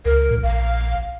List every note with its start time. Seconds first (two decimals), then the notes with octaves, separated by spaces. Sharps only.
0.05 C#2 A#4
0.31 A2
0.43 A#1 F5